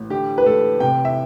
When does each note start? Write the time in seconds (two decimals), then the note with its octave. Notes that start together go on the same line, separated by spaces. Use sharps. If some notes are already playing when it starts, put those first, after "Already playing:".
Already playing: A1
0.10 D3 G4
0.38 B4
0.45 A1 A4
0.80 C3 G5
1.05 E5